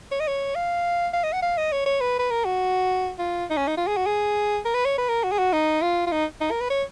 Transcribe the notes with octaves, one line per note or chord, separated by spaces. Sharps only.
C#5
D#5
C#5
F5
F5
D#5
F#5
F5
D#5
C#5
C#5
B4
B4
A#4
F#4
F4
D#4
C#4
D#4
F4
G#4
F#4
G#4
A#4
B4
C#5
B4
A#4
F#4
G#4
F#4
D#4
F4
F4
D#4
D#4
A#4
B4
C#5